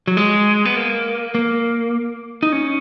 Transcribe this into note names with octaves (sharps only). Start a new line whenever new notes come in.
F#3
G#3
B3
A#3
A#3
D#4
C#4